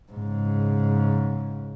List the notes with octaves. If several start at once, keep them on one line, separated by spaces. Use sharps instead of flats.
G#2 C#3